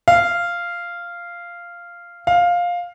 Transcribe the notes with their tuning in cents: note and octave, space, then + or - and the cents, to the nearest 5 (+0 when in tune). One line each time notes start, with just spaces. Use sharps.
F5 -10
F5 +10